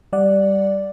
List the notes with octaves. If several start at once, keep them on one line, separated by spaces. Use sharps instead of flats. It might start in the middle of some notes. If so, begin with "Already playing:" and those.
G3 D5 F#5